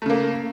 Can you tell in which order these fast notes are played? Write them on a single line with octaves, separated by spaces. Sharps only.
A3 C#3 A#3